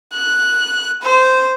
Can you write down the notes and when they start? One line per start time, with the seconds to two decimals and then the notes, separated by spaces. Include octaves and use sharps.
0.13 F#6
1.02 C5